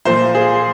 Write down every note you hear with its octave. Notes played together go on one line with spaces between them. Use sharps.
A#2 F3 C5
G#4